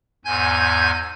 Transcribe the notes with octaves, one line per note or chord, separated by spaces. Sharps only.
E2 G#2 G#5 G6 G#6